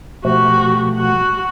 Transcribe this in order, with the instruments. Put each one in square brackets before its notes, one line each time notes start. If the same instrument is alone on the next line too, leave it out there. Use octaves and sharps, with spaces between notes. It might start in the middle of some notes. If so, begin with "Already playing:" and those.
[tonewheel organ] B2 F3 A3 [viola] F#4 G4
[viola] F#4 F#5